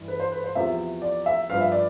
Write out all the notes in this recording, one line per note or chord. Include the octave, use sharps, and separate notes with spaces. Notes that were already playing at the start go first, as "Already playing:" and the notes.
Already playing: G2 E3
B4
C5
B4
C5
E2 C3 F3 E5
D5
E5
G2 F3 F5
E5
D5